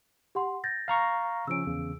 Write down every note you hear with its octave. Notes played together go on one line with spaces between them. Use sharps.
G4 F#5 C6
G6 A6 A#6
F5 A#5 C#6
C#3 F3 C#4 E6 D7
E2 C#3